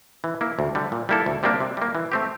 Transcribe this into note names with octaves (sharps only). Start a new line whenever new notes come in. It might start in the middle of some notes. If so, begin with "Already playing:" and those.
E3
A#3 E4
D2
D3 G3
A#2
G3 A#3 E4 A4
D2
C3 G3 A#3 D4
C3
G3 A#3
E3
A3 C4 G4